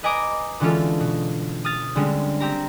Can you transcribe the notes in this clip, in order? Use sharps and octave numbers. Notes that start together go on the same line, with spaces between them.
B4 D#5 G#5 A#5 D6 D#6
D3 E3 G#3 C#4 F4 A4
B2
D#6 F6 A6
D3 G3 G#3 C4 C#4
C4 G4 A#5